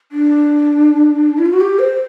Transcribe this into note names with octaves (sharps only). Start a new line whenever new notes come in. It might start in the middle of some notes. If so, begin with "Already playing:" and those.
D4
E4
F4
F#4
G4
C5